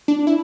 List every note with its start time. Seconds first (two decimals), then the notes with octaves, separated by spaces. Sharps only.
0.08 D4
0.27 E4